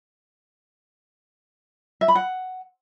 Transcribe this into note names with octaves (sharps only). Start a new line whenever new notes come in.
E5
B5
F#5